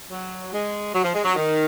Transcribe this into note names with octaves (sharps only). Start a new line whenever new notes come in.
F#3
G#3
F#3
F3
G#3
F#3
D#3